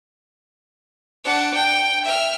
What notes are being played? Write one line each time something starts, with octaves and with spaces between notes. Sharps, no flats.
D4 F#5
G5
E5 F6